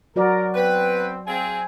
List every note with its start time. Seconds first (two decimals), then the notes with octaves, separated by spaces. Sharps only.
0.16 F#3 F#4 A#4 D5
0.54 B3 C4 B4 G5
1.27 C4 G#4 F5 G#5